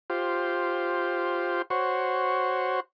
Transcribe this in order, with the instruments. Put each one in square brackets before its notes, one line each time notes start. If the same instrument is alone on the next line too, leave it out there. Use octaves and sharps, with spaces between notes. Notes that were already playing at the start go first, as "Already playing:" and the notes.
[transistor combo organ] F4 G4 C5
F#4 C5 C#5